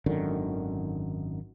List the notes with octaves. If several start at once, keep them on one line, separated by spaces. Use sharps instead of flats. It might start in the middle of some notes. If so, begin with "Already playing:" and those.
G#1 F#2 D3 D#3